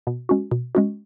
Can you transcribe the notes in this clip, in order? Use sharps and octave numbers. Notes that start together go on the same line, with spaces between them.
B2
G#3 C#4 F#4
B2
G#3 C#4 F#4